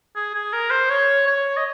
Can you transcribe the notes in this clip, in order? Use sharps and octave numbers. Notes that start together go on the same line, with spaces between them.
G#4
G#4
A#4
C5
C#5
C#5
D#5